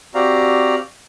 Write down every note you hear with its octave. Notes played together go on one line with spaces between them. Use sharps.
C4 F#4 G4 D5 F5 A#5